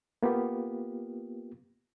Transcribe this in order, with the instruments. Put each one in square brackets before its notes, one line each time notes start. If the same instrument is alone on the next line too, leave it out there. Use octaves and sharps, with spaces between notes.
[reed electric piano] A#3 B3 F4 G4